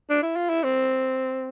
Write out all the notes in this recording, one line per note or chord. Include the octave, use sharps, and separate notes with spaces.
D4
E4
F4
E4
C4